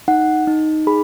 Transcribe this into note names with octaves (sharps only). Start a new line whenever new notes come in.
D#4 F#5
D#4
G#4 B5